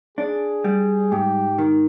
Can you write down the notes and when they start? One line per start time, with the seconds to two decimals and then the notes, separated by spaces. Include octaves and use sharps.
0.17 D4 G#4
0.64 G3
1.11 G#2 G4
1.58 D#3